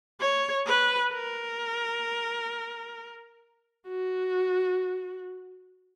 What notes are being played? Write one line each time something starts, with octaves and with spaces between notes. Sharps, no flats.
C#5
B4
A#4
F#4